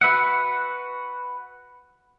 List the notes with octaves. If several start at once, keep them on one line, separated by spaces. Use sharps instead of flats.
F#4 B4 E5 F#5